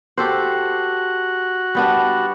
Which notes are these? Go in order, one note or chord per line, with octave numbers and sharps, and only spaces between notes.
F#4 G4 A4 C5
G3 B3 D4